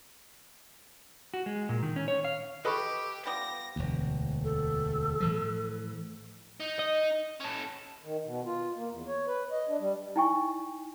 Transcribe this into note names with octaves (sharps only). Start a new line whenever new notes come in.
F#4
G#3
A#2
D#3
C#4
C#5
F5
G4 A4 B4 D#5 B5 C#6
F3 G3 B3 A#6
E1 D2
A4
A2 E3 F3
D#4
D#5
C#4 A4
D#3
B2
F4
A#3
E2
C#5
B4
D#5
D4
G3
D#4 E4 G5 G#5 C#6